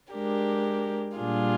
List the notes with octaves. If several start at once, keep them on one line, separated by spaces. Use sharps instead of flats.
G#3 D4 G4 A#4
A#2 G3 D4 F4 G#4